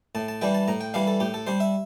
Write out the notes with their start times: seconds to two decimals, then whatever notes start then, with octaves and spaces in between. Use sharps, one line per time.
0.15 A2 A5
0.28 A5
0.41 E3 G3 D4 G5
0.54 A5
0.68 A2 A#5
0.81 G5
0.94 E3 G3 D4 F5
1.07 A4
1.20 A2 G4
1.34 A4
1.47 G3 D4 C5
1.60 E5